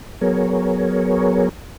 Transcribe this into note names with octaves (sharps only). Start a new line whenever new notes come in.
F#3 B3 G#4 A#4 C#5